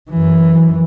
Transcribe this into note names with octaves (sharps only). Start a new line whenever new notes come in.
F#2 E3